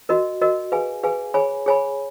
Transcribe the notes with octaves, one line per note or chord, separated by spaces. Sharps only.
F#4 A#4 D#5
F#4 A#4 D#5
G#4 B4 F5 G#5
G#4 B4 F5 G#5
G#4 C#5 G#5 B5
G#4 C#5 G#5 B5